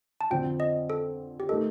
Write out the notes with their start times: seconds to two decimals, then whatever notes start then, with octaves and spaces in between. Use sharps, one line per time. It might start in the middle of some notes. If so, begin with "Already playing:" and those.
0.21 A5
0.31 F2 D3 F3 C4 G5
0.60 D#5
0.90 A4
1.40 G4
1.49 A3 D#4 A4 A#4 D#5